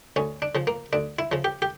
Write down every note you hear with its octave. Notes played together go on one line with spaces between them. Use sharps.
D2 C#4
D4
C#3 F3
A#3
D2 D4
E4
C#3 F3
G4
G4